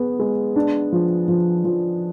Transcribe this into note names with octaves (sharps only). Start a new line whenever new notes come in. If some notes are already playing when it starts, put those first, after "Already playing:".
Already playing: B3 G#4
G#3
D4
F3
F3
F3